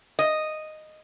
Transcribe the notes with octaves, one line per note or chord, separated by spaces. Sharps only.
D#5